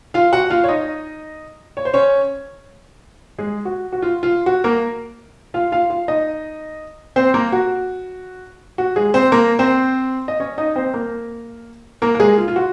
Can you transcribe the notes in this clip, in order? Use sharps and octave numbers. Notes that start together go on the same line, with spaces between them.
F4 F5
F#4 F#5
F4 F5
C#5
D#4 D#5
C#5
C5
C#4 C#5
G#3 G#4
F#4
F#4
F4
F4
F#4
A#3 A#4
F4 F5
F4 F5
F4 F5
D#4 D#5
C4 C5
A#3 A#4
F#4
F#4
G#3 G#4
C4 C5
A#3 A#4
C4 C5
D#5
C#4 C#5
D#4 D#5
C4 C5
A#3 A#4
A#3 A#4
A#4
G#3 G#4
F4
F4
F#4